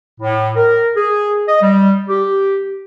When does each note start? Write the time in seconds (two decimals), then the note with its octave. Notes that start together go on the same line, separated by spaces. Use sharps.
0.21 A2
0.56 A#4
0.96 G#4
1.48 D#5
1.62 G3
2.09 G4